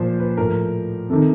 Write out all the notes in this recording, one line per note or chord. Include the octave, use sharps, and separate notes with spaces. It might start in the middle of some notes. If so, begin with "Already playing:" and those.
Already playing: A#2 F3 C5
B4
A2 F3 A#4
C3 D#3 A4